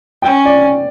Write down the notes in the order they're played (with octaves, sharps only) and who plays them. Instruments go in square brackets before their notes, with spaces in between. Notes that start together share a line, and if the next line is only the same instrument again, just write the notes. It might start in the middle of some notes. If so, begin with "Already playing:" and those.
[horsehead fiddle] C#4 [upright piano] G5
[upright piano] D5